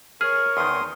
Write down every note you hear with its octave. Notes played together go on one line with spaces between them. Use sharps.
G#4 A#4 C#5 F6
E2 D#3 C6 D#6